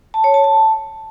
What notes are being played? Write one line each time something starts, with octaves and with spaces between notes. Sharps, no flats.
A5
C#5
A5
A5